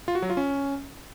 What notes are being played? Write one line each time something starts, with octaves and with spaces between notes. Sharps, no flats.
F4
F#4
F#3
F4
C#4